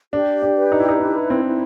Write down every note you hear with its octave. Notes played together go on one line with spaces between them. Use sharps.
D4 G4
D4
B4
D#4
E4
D#4
D4 E4
C4
E4